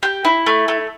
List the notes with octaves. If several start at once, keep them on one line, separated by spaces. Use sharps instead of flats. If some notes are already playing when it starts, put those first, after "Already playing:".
G4
E4
A3
A3